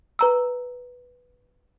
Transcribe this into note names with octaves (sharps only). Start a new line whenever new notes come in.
B4 A#5 E6